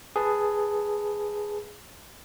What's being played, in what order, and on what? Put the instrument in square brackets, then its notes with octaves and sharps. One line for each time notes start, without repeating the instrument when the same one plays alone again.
[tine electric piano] G#4 B4 A5